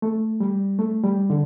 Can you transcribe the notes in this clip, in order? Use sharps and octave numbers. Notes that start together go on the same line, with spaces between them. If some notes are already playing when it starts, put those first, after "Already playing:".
A3
G3
A3
G3
D3